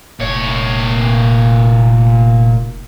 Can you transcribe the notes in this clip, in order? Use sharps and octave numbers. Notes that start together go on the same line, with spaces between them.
F1 A#2 C#5